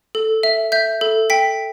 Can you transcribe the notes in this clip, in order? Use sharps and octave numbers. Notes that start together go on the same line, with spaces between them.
A4
E5
E5 G6
A4
G5 B6